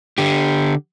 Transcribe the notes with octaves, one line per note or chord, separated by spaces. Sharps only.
D3 G4